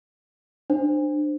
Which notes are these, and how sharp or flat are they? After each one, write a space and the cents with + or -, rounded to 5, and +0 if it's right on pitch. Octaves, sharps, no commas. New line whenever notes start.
D4 +30 C5 +0